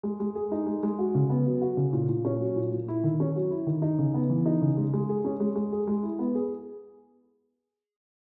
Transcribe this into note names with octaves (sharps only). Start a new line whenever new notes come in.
G#3
G#3
G#4
D#4
G#3
G#3
F#4
C#3
B3
F#3
F#4
C#3
A#2
A#2
C#4
F#3
A#2
A#2
E4
D#3
C#4
F#3
E4
D#3
D#4
C#3
B3
E3
D#4
C#3
G#3
G#3
G#4
C#4
G#3
G#3
G#4
G#3
E4
B3
G#4